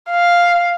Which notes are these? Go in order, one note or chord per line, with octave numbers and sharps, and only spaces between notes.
F5